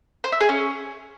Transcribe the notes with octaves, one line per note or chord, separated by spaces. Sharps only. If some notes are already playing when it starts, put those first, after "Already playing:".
C5
E5
G#4
C#4